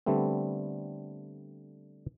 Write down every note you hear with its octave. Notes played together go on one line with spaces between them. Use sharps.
D3 G3 A3 B3 C4